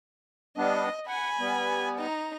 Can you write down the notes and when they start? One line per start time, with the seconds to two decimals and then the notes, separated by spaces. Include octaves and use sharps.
0.58 G3 B3 D4 D#5
1.07 F#5 G#5 B5
1.40 G3 B3
1.99 D#4 A#5